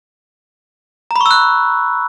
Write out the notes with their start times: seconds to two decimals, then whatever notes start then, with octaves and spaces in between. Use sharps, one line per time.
1.11 A#5
1.16 B5
1.21 C#6
1.26 E6
1.31 F#6